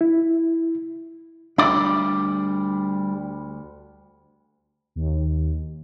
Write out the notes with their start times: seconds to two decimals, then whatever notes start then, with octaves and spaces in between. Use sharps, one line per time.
0.01 E4
1.58 D2 G3 D4 D5
4.95 D#2